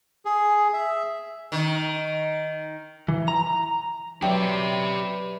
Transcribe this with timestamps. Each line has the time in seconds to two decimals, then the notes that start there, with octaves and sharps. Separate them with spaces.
0.25 G#4
0.73 E5
1.52 D#3
3.08 E3
3.28 A#5
4.22 F#3 G4 B4 C#5 D5 E5 G5